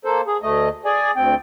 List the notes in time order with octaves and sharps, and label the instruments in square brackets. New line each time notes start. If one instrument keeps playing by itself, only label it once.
[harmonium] A#3 A4 C5
G#4
D2 A3 D#5
G#4 D5 G#5
D2 C4 G5